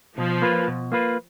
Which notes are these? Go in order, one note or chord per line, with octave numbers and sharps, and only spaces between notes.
B2 F3
A#3 F4 B4
B2
A#3 F4 B4